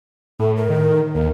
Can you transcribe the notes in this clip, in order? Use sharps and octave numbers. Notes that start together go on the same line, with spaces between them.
A2 A4
A#4
D#3
D#2 A#4